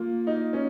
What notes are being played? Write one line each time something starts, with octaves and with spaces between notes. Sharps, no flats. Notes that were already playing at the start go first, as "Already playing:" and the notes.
Already playing: A#3 F4
D#4
C#4